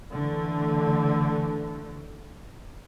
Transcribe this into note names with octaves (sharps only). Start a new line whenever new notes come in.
D3 E3 A3